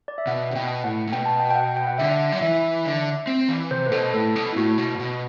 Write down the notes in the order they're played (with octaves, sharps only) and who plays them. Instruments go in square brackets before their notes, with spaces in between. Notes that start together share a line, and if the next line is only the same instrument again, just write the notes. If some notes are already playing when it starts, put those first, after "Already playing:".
[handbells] D5
E5
[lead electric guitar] B2 [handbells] F#5
[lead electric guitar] C3
[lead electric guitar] B2 [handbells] G5
[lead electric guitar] A2 [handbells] F#5
[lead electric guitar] A2
[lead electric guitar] B2 [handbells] G5
[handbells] A5
G5
G5
F#5
G5
F#5
[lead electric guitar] D3 [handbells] E5
[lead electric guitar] F#3
[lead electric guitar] E3 [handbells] E5
[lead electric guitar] D3
C4
E3
[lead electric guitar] C3 [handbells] C5
[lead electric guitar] A2 [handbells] B4
[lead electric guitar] B2 [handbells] A4
[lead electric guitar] A2 [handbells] A4
[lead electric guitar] B2
[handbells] E4
[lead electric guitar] A2 [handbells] F#4
[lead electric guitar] B2
A2
B2